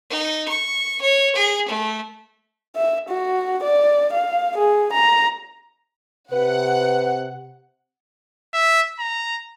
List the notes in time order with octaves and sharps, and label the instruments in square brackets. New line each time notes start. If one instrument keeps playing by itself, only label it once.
[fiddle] D#4
C#6
C#5
G#4
A3
[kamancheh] E5
F#4
D5
F5
G#4
A#5
[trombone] C3 [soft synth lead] B4 [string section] F#5
[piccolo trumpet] E5
A#5